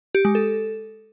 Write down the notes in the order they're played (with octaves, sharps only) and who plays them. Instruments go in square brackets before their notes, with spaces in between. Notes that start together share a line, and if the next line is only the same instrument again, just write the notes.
[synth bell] G4
G#3
A4